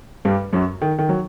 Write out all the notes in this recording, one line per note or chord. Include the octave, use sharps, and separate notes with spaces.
G2 G3
F#2 F#3
D#3
D#3
F#3